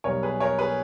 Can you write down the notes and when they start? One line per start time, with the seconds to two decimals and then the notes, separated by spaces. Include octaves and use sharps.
0.04 B1 B2 G3 A#4 C#5
0.23 G#4 B4
0.40 A#4 C#5
0.59 G#4 B4